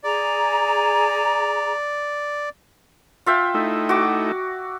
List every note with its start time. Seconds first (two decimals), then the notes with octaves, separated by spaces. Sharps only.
0.04 G#4 D5 A#5
3.26 F4 E5 G5
3.54 A3 D#4 E4
3.89 F#4 D6